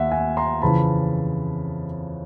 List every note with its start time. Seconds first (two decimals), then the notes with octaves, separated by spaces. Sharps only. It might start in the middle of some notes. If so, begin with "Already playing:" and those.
Already playing: D#2 E5 F#5
0.11 F#5 G#5
0.37 A#5 C6
0.62 F2 C#3 E3 A5 B5